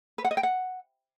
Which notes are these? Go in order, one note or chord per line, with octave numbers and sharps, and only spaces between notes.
B4
F#5
D#5
G5
F#5